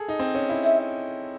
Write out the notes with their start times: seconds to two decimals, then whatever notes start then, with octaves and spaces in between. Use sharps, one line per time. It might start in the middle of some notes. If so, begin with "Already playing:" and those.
Already playing: G#4 A4
0.08 D#4
0.19 C4
0.35 C#4
0.49 E4
0.64 E5